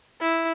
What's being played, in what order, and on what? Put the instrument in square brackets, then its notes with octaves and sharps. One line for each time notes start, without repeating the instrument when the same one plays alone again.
[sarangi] E4